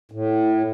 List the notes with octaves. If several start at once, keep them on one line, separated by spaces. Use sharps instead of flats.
A2